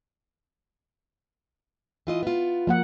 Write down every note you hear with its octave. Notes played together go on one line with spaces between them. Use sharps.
E3 F4 D#5
B3 F4
F3 A#3 F#5